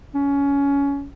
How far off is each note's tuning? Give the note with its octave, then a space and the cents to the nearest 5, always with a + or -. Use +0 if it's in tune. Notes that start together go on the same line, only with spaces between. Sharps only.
C#4 +20